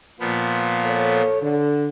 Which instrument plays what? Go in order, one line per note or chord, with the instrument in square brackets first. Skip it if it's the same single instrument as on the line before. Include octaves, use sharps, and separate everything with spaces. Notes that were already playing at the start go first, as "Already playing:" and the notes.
[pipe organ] A#2 F3 B3
[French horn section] A4 C#5
D3